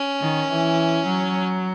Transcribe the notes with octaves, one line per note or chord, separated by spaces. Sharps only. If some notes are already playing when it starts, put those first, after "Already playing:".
Already playing: C#4
D#3
E3
F#3